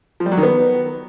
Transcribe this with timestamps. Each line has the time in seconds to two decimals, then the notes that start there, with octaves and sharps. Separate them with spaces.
0.20 F3
0.26 G3
0.32 F#3
0.37 D#3
0.43 B3